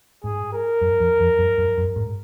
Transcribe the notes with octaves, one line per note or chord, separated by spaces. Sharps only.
G#2 G#4
A#4
F#2
F2
F2
F#2
F#2
F#2
G#2